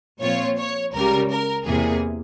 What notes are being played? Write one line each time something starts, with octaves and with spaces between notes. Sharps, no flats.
A#2 F3 C4 F4 C#5
C#5
C#2 C#3 G3 A#4
A#4
E2 C3 E3 A#3 G#4